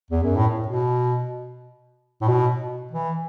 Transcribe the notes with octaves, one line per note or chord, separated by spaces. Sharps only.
E2
F#2
A2
B2
A2
B2
E3